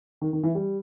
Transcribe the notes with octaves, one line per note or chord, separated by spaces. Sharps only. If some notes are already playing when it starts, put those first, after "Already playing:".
D#3
D#3
E3
G3